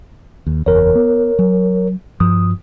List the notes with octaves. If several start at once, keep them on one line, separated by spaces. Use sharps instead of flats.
D#2
F#1 E2 A#4 C#5
B3
F#3
G2 F3 D#6